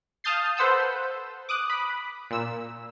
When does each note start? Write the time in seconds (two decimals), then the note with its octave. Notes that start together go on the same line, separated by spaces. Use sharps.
0.24 F5 A5 D#6 G6 A6 C7
0.57 A4 B4 C5 F#5 E6 G6
1.49 D6 D#6 F#6
1.70 B5
2.30 A#2 E6